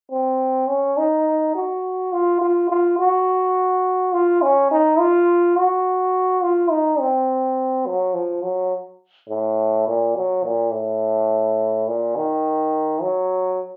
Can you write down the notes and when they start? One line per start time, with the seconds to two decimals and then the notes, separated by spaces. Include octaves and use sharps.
0.11 C4
0.69 C#4
0.98 D#4
1.55 F#4
2.13 F4
2.41 F4
2.69 F4
2.99 F#4
4.13 F4
4.42 C#4
4.71 D#4
4.99 F4
5.57 F#4
6.43 F4
6.71 D#4
7.00 C4
7.87 F#3
8.14 F3
8.43 F#3
9.29 A2
9.88 A#2
10.16 F#3
10.44 A#2
10.73 A2
11.88 A#2
12.16 D#3
13.02 F#3